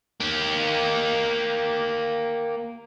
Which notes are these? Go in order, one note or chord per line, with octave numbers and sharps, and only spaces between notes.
A#3 G4